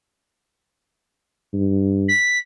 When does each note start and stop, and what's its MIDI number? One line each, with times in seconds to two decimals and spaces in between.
1.53 2.09 43
2.08 2.38 95